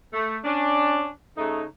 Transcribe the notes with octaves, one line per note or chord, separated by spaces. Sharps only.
A3
C#4 D4
C#3 A3 D#4